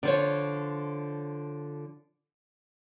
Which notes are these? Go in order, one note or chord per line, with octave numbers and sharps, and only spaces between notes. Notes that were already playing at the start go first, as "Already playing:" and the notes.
D3 F3 C#5